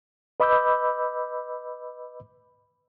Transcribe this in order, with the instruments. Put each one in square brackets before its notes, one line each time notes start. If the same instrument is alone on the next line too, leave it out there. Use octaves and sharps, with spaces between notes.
[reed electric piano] B4 D#5 B5 D6 E6 G6